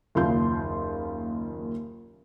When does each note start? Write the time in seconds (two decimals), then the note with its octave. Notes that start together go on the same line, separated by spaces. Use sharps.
0.15 F#1 D#2 F4 C6 G6